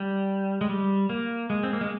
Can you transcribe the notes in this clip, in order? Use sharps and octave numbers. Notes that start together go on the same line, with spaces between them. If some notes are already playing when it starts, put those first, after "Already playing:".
Already playing: G3
G#3
G3
A#3
G#3
C4
A#3
G#3